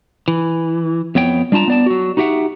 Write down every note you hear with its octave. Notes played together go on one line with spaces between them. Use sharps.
E3
F2 B3 C#5 G5
G3 D4 F4 A5 A#5
B3 D5 A5
F#3 F#4
D#4 F#4 G4 E5 F#5